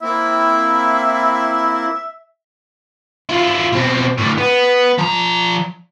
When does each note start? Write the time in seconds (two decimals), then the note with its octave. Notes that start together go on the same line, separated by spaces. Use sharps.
0.02 A#3 C4 E4 E5
3.29 E4 F4
3.73 B2 C4
4.19 A2 D3
4.38 B3
4.98 F3 A#5